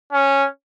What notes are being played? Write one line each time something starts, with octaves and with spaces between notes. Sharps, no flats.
C#4